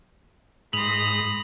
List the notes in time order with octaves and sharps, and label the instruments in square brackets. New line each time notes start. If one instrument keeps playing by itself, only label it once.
[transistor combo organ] G#2 D#6 [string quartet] B5 C6 A#6 [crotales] F7 F#7